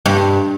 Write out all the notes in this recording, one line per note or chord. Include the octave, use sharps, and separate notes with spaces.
G2